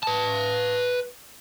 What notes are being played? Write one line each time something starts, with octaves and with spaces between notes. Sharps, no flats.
B4 A5